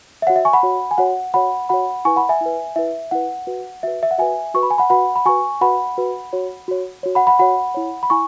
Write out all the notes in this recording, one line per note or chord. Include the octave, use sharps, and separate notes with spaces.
E5
F#4 C#5 F#5
E5
G#5 C#6
F#5 B5
F#4 C#5
G#5
F#4 C#5 F#5
F#4 C#5 F#5 B5
F#4 C#5 F#5 B5
E4 B4 G#5 C#6
F#5 B5
E5 G#5
E4 B4
E4 B4 E5
E4 B4 F#5
F#4 B4
F#4 B4 E5
E5
F#5
F#4 B4 E5 G#5
F#4 B4 C#6
B5
G#5
F#5 B5
F#4 B4 F#5 B5
B5
F#4 B4 G#5 C#6
F#4 B4 F#5 B5
F#4 B4
F#4 C#5
F#4 C#5
F#4 C#5
F#5 B5
F#5 B5
F#4 C#5 F#5 B5
E4 C#5
B5
E4 G#5 C#6